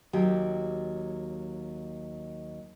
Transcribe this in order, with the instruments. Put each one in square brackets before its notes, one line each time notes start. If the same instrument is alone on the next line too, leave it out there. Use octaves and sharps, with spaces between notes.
[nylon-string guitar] D#2 F#3 G4